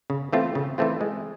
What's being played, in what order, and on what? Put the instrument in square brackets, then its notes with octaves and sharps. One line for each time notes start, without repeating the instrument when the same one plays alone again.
[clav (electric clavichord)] C#3
E3 A3 C4 F4
C#3
E3 A3 C4 F4
G#3